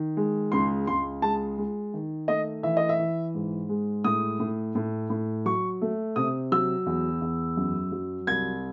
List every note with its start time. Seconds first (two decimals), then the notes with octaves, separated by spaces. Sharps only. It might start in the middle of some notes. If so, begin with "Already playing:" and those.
Already playing: D#3
0.17 G#3
0.52 C#2 C6
0.87 C#2 C6
1.22 G#3 A5
1.58 G#3
1.94 D#3
2.28 A3 D#5
2.63 E3 E5
2.77 D#5
2.89 E5
2.98 E3
3.35 G#2
3.69 G#3
4.04 A2 D#6
4.40 A2
4.75 A2
5.10 A2
5.45 F#3 C#6
5.81 A3
6.16 C3 D#6
6.52 F#3 E6
6.86 E2
7.22 E2
7.57 F#2
7.92 F#3
8.27 C2 G#6